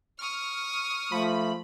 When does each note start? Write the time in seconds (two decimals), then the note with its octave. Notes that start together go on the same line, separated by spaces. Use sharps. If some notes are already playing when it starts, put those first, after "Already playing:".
0.19 C#6 D#6 F6
1.12 F3 A3 B5